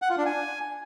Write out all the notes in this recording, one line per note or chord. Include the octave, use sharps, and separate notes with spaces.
F#5
F4
D4
G#5